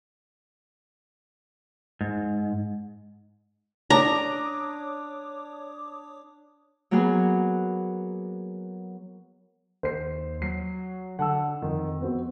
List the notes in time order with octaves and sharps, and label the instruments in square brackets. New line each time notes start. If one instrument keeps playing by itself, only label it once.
[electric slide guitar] G#2
[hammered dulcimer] D4 [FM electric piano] C#5 D6 D#6 [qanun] A#5
[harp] F#3 A#3 B3 F#4 G#4 B4
[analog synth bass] D#2 [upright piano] C5 C7
[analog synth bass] F#3 [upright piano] C7
[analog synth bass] D3 [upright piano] F#5 A5 E6
[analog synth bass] F2 [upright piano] D#3
[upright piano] B3 C4 F#4